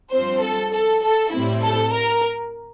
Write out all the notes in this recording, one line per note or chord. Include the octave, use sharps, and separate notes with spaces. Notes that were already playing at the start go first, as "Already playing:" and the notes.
G2 F3 C4 C5
A4
A4
A4
A2 G3 C4 E4
A4
A#4